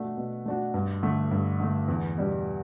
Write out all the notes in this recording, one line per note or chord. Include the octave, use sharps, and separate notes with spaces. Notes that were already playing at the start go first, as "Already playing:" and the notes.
Already playing: B2 A3 D4 F#4
B2
A3 D4 F#4
G2
D3 A3
G2
D3 A3
E2
B2 G3 D4